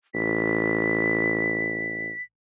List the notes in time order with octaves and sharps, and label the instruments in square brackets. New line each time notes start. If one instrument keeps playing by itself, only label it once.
[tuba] A1 [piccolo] B6